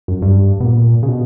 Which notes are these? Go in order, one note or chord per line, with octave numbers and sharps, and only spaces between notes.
F#2
G2
B2
A#2
C#3
B2